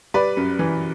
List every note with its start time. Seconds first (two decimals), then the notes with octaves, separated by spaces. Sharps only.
0.14 G3 B4 D5
0.37 F#2
0.59 E3